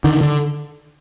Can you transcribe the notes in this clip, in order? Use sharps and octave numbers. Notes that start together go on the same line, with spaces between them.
D3 D#3
D3